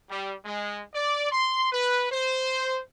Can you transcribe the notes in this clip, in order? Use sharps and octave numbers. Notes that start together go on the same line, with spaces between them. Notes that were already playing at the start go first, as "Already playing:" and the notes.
G3
G#3
D5
C6
B4
C5